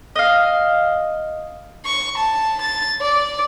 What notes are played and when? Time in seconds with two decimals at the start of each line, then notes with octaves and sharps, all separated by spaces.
0.16 D#5 F5
1.85 C#6
2.17 A5
2.61 A6
3.01 D5